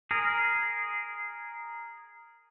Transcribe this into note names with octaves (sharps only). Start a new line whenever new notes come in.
G#4 A#4